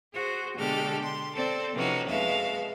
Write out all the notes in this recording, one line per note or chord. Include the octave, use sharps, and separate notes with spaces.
F#4 G#4 C5
B2 D3 G#3 G4 A4 F6
C6
C4 A4 C5 D5 A5
C3 E3 F3 C#4 D#4 F#4
F2 B2 G#3 E5 F5